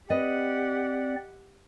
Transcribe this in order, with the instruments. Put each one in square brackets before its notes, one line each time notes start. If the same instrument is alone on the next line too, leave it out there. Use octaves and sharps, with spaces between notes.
[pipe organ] C4 D5 [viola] G4 F#5 [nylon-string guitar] B4 D#5